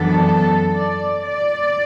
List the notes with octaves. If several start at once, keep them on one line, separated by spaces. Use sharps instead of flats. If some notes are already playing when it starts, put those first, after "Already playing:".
Already playing: F#2 E3 B3 D4 A4
D5
D5